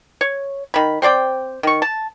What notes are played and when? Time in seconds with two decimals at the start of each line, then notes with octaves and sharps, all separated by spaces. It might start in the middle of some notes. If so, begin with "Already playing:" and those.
0.21 C#5
0.74 D#3 B5
1.02 C4 C5 D5 G5
1.63 D#3 C#6
1.82 A5